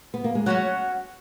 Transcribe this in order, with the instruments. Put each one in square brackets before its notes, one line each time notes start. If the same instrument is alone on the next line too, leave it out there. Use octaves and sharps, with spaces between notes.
[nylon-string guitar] B3
A#3
G#3
[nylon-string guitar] F#3 [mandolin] C#4 F#4 C#5 F#5